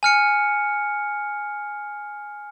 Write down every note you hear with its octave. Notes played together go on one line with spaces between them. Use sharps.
G#5 F6 C#7